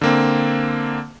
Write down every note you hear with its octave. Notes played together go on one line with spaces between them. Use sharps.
D3 A#3 C4